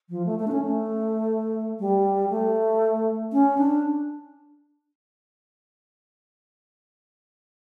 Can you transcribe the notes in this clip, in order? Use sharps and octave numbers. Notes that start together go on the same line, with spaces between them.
F3
A3
A3
D4
C#4
A3
G3
A3
C#4
D4